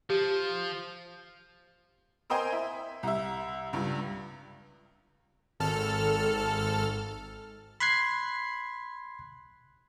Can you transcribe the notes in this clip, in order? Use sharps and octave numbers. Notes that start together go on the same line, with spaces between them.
F3 G4
A#4 C5 D#5 G5 G#5 C6
E4
C2 E5
C#2 G2
G#1 A4 F6
B5 C6 F#6 G#6 C7